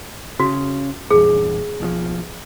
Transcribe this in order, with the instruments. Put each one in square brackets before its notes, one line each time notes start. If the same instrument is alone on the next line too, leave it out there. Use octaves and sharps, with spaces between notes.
[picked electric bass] C#3 [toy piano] F#4
[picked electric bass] A#1 E2 G2 [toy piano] G#4
[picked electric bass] B1 D#3 F3